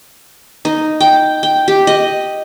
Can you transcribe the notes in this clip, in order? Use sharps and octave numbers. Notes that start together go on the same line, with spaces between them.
D#4
G5
G5
G4
D#5